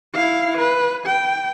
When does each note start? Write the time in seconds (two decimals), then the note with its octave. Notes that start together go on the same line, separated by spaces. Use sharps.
0.14 E4 F5
0.57 B4
1.06 G5